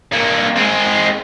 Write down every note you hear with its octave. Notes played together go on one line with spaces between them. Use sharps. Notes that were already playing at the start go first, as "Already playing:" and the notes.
G2 A#3
G#3 C4